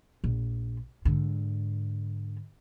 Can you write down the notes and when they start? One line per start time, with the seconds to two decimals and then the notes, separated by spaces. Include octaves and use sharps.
0.24 A#1
1.05 G#2 D3